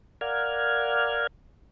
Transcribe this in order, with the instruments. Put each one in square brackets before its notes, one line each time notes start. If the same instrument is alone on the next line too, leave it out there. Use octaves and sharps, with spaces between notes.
[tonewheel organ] A#4 D5 F5 F#5 F6 G#6